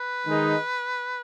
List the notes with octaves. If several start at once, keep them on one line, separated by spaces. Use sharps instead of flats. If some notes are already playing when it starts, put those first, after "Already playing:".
Already playing: B4
D#3 G#3 D#4